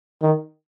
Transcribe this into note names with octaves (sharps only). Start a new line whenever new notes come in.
D#3